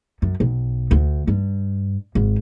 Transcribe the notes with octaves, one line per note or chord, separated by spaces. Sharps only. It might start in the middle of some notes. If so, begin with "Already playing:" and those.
F#2
B1
D2
G2
G#1